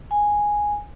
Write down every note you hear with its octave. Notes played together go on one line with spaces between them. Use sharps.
G#5